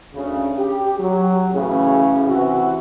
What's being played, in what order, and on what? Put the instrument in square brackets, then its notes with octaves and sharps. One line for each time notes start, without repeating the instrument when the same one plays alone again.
[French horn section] D2 C#3
G4
F#3
A2 C#3 E3 F#4 G#4
C3 E3 E4 F#4